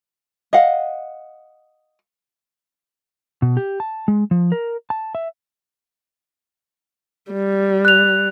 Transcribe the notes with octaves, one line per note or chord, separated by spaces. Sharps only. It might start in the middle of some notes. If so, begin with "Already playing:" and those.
D#5 F5 F#5
B2
G4
A5
G#3
F3
A#4
A5
E5
G3
F#6 F7